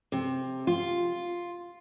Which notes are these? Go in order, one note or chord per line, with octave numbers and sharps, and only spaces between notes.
C3
F4